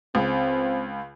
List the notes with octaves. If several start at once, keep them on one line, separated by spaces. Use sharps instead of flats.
C#2 C4